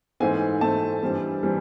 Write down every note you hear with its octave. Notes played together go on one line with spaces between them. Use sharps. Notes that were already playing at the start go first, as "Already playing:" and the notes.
G#2 E3 A3 C4 G#5
G#2 E3 A3 C4 A5
G2 E3 G3 C4
E3 G3 C4